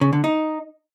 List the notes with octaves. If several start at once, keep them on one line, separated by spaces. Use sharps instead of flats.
C#3
D3
D#4